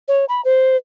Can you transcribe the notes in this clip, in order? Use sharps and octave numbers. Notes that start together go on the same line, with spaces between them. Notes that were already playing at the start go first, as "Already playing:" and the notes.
C#5
B5
C5